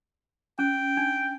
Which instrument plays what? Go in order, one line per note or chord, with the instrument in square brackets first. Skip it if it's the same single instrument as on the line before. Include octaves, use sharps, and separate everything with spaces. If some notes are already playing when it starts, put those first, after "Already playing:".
[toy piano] C#4 [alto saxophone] G5
[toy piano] D4